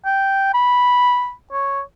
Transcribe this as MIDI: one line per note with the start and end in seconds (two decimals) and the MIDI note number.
0.06 0.52 79
0.54 1.32 83
1.52 1.80 73